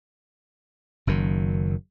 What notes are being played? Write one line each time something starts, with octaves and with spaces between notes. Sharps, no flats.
F#1 F#2 D#3